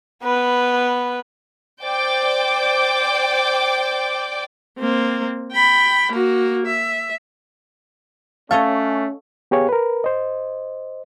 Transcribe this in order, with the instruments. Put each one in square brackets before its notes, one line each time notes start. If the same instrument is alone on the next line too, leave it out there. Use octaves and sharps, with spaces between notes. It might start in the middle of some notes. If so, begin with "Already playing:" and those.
[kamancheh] B3 B4
[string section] C5 D5 G5 D6 G6
[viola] A#3 C4
G5 B5
A#3 F#4
E5
[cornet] A3 [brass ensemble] C#4 [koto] A4 C#5 D#5 [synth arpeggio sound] F5
[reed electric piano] B3 G4 G#4 C#5 F5
A#4 B4
C5 D#5